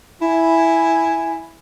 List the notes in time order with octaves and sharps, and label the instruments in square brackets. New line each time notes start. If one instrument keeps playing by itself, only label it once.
[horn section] E4 G#5